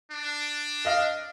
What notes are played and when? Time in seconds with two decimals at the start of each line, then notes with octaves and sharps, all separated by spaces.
0.11 D4
0.85 D#5 F5 F6